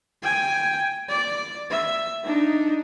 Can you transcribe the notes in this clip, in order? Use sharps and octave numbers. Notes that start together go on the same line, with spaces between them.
G5 G#5
D5
E5
D4 D#4